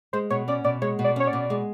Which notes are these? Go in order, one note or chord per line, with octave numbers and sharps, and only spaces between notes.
G#3 C5
B2 C#5
C#4 D5
B2 D5
G#3 C#5
B2
D5
C#4 C#5
D5
B2
G#3